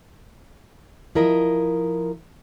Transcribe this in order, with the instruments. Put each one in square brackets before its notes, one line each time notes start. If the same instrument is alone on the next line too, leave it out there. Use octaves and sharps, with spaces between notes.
[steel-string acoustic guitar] F3 E4 A#4 D#5